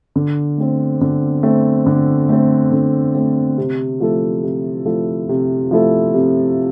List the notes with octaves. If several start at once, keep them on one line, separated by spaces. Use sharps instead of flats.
D3
A3 C4
D3
A3 C4
D3
A3 C4
D3
A3 C4
C3
F3 A3 E4 A4
C3
F3 A3 E4 A4
C3
F3 A3 E4 A4
C3